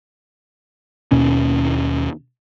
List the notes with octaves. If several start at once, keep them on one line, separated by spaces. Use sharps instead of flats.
D#2 B2 C#4